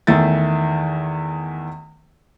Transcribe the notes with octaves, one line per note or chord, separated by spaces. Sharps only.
E2 D#3 A3 E4 A6